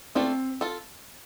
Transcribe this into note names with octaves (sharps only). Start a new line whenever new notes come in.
A3 C4 D4 F4 A4
F4 A4